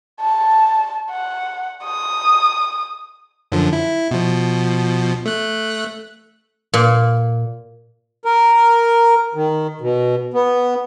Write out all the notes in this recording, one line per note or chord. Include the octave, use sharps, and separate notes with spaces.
A5
F#5
D#6
F#2 D3 F3
E4
B2 F3
A3 F#6
A#2
A#4
D#3
B2
B3